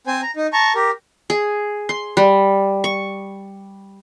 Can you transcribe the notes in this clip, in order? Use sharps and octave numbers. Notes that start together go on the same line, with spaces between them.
C4 C5 G#5
A#5
D#4
A5 A#5 C#6
G4 A#4
G#4
C6
G3
C#6